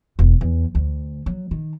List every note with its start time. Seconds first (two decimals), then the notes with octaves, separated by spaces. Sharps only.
0.19 E1
0.41 E2
0.75 D2
1.26 F#3
1.51 D#3